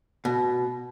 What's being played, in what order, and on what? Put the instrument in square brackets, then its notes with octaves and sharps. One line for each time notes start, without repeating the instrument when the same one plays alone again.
[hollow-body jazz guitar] B2